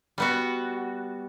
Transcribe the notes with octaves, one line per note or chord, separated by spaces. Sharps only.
G3 B3 F#4